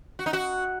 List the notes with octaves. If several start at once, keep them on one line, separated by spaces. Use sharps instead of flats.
F#4
D#4
F#4